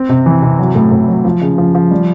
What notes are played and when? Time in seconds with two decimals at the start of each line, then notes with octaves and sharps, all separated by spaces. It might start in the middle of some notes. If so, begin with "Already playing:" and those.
Already playing: C4
0.09 C3
0.26 E3
0.42 C3
0.59 F#3
0.75 A2
0.91 A2
1.08 F#3
1.25 F3
1.41 C#3
1.58 F3
1.75 F3
1.91 G3